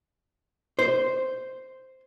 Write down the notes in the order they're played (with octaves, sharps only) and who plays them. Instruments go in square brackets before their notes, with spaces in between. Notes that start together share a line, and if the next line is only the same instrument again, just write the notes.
[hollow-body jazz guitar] C5